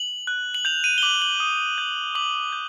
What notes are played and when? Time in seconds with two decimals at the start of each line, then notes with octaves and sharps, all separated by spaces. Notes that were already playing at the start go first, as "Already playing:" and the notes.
Already playing: F#7
0.27 F#6
0.55 F#7
0.65 G6 F7
0.84 D#7
0.98 G7
1.02 D6 F#7
1.22 F#7
1.40 D#6
1.78 G6
2.15 D6 F#7
2.52 G6